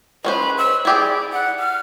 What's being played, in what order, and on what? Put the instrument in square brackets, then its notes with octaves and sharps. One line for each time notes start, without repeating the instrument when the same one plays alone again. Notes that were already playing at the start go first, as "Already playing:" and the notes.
[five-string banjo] G#3 C#4 C5 [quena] B4
[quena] E6
[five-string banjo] E4 G4 G#4 [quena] D5
[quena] F#5
F6